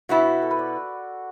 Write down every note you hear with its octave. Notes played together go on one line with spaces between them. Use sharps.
B2 B3 E4 F#4
A4
B4
D5